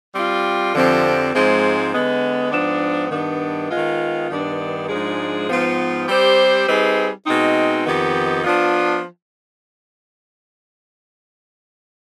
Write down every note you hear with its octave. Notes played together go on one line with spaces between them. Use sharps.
G3 C4 F4
F2 D3 F3 C4 G4
G#2 F3 G#3 C4
D3 G#3 B3
G#2 F3 B3 D4
G2 D#3 B3 D4
D#3 G#3 B3 F4
G2 D#3 B3 D4
G#2 F3 G#3 D4 G#4
G#2 F3 B3 F4
G3 C4 G4 C5
G3 C4 D#4 G#4 B4
B2 G#3 C4 D#4
F2 D#3 B3 D#4 G4
F3 B3 D4 F4